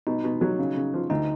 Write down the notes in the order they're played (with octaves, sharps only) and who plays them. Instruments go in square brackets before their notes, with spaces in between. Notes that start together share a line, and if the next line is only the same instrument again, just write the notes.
[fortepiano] B2 [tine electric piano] D#4
[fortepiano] B2
F#3
C#3
C#3
F3
[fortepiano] D2 [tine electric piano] D#4